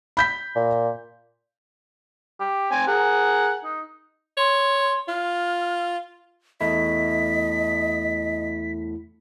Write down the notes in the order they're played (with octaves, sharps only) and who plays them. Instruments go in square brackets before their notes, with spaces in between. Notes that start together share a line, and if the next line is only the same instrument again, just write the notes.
[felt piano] B5 G6 B6
[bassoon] A#2
[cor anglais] G4
[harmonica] C4 G#5
[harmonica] G#4 A#4 [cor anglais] F#5
[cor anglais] D#4
[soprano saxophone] C#5 [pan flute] C6
[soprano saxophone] F4 [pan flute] F6
[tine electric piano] E2 A3 E4 [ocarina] D#5 [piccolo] B6